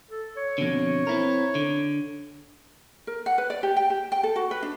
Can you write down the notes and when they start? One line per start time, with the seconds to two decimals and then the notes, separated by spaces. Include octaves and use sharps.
0.11 A4
0.37 C#5
0.58 F2 B2 D3
1.07 C4 E4 A#4
1.55 D3
3.07 A#4
3.26 F#5
3.38 B4
3.50 D5
3.63 G4
3.76 G5
3.90 G4
4.12 G5
4.23 A4
4.36 F#4
4.51 B4
4.63 D4